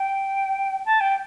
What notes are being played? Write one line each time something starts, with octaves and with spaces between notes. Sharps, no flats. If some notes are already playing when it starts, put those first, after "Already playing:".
Already playing: G5
A5
G5